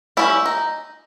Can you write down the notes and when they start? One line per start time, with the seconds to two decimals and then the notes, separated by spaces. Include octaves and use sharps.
0.17 G3 C#4 E4
0.46 D#4